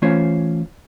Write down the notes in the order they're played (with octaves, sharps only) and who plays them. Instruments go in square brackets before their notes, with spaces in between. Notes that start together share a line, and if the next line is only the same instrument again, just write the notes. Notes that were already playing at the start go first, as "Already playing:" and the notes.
[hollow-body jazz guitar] E3 A3 C#4 F4 C5 C#5